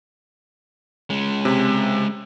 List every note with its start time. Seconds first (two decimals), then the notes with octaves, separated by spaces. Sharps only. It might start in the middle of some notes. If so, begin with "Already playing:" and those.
1.10 G#3 C#4
1.45 C3